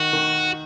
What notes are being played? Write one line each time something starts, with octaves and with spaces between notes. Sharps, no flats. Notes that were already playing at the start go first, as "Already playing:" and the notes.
Already playing: D#3 F#4
D#3